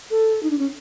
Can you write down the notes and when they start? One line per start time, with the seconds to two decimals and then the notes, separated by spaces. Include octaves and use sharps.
0.10 A4
0.43 D#4
0.50 D4
0.59 C#4